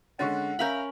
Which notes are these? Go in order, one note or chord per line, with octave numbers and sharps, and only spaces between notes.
D3 G#3 C#4 F#5 C#6 A6
C#4 A#4 E5 F5 A#5 B5 G6